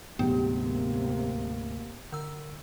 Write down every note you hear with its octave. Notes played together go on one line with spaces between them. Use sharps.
D2 G#2 C3 F#3 B3 G4
A#3
D3 E6